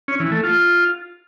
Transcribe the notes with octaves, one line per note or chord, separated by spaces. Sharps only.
C#4
E3
A3
F4